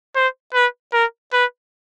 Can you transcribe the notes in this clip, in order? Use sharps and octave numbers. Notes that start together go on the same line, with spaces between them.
C5
B4
A#4
B4